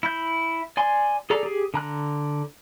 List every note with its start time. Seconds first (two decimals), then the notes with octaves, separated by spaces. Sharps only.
0.03 E4 G6
0.77 D5 G#5 C6
1.30 G#4 A4 D5 A#5
1.43 G4 G#4
1.74 D3 A#5 F#6